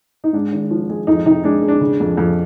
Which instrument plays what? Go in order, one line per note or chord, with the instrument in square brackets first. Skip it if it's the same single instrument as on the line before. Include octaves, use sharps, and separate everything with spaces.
[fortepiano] D#4
G#2 D4
G#1
F3
G#3
F2 D#4
C3 D#4
G#3 D4
G#3
D4
C#3
F2
F2